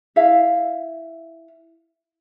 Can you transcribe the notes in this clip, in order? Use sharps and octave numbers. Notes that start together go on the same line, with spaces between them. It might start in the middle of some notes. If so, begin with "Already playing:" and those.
E4 E5 F5